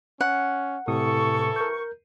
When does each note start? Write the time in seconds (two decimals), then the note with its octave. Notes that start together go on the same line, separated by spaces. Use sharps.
0.21 C#4 F#5
0.88 C2 A2 C3 E3 A4 C#6 D#6
1.56 A#4 G6